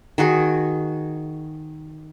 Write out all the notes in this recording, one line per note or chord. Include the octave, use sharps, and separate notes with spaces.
D#3 F#4 G#4